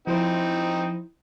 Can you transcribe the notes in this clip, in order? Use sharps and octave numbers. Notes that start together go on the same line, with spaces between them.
F3 C4 D#4 E4 C5